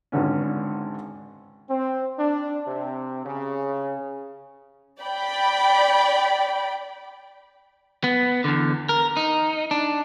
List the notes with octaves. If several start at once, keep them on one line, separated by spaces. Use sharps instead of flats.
G#1 C#2 D3 C#4
C4
D4
C3
C#3
D5 G5 B5
B3
E2 D3
A#4
D#4
D4